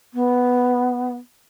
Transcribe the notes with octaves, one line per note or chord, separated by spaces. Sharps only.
B3